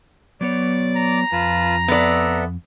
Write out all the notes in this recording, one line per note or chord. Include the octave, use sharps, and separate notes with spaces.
F#3 B3 C#5 D5 D6
A#5
F2 F4 B4 A5
B3 A4 D5 E5 F#5